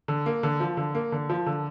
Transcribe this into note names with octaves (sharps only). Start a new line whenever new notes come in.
D3
A#3
D3
F3
D3
A#3
D3
F3
D3